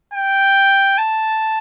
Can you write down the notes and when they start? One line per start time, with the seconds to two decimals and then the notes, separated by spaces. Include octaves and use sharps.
0.13 G5
0.98 A5